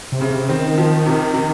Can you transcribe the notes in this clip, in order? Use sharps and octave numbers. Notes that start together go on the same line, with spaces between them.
C3
C#3
C3
D#3 C4
F3
C3
C3